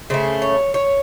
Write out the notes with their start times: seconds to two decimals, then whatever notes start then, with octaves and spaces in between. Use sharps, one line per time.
0.10 C#3 A3 C5
0.42 C#5
0.74 C#5